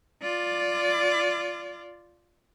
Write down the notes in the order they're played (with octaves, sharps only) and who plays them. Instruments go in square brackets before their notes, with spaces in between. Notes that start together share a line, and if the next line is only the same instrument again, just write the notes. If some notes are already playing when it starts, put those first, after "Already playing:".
[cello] F4 D5